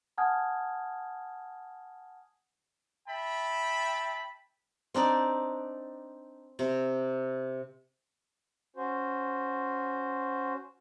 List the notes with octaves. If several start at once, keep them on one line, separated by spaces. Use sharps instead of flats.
F#5 G#5 A5 D#6 F6 G#6
E5 G5 A5 B5
C4 D4 D#4 D5
C3
C#4 F#4 C5